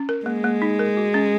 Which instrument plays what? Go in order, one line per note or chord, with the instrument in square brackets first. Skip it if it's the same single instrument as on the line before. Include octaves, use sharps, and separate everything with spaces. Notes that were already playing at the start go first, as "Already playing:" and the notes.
Already playing: [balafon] C#4
A#4
[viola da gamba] G#3 [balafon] A#3
[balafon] A#3
D#4
A#4
F#4
C#4